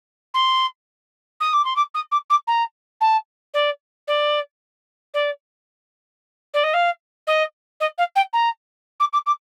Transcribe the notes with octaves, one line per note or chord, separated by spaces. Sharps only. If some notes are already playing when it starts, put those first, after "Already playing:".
C6
D#6
D6
C6
D6
D#6
D6
D6
A#5
A5
D5
D5
D5
D5
D#5
F5
D#5
D#5
F5
G5
A#5
D6
D6
D6